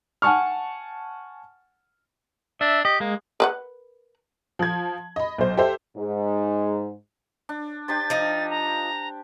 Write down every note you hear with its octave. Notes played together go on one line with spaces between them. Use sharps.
F#5 G#5 A5 C#6 F6
D4 E5
G4 D#5
G#3 A#3
A#4 B4 F#5
F3 G#6
D#5 B5
B1 C5
G4 A4 C5 E5
G#2
D4
D4 G4 C5 A6
F3 D#4
A#5